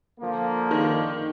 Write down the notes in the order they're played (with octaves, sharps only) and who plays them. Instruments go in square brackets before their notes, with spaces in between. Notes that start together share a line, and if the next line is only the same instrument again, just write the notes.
[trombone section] D3 F3 A#3
[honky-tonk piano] D#3